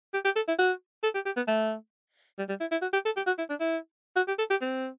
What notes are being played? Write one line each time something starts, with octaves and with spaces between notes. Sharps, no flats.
G4
G4
A4
E4
F#4
A4
G4
G4
B3
A3
G3
G3
E4
E4
F#4
G4
A4
G4
F#4
E4
D4
E4
F#4
G4
A4
G4
C4